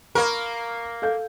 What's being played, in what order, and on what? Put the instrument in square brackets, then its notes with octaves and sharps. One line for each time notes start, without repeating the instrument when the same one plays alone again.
[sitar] A#3 A#4 [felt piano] B5 C#6
[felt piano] A4 F5 G6